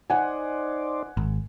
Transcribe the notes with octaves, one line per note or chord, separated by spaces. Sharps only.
D#4 C5 D5 F#5 G#5
G#1